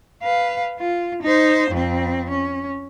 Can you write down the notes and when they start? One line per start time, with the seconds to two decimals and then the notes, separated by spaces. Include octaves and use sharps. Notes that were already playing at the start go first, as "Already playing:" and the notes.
0.22 B4 F5
0.79 F4
1.23 D#4 C5
1.71 F2 C4
2.30 C#4